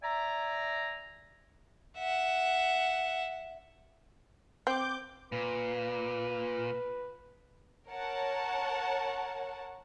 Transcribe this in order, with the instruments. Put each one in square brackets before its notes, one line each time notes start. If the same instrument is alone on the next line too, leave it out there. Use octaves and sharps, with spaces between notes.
[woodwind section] D5 E5 G#5 A#5
[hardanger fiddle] E5 F#5
[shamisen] C4 [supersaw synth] D6 G6
[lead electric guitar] A#2 [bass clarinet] B4
[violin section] A#4 C#5 F#5 A5